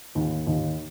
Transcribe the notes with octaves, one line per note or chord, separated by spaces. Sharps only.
D#2
D#2